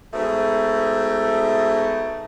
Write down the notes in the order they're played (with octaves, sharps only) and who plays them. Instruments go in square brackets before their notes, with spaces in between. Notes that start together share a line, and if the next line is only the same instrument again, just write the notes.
[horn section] G#2 B2 A3